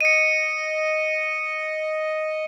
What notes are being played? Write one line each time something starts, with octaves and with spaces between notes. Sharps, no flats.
D#5 C#7 D#7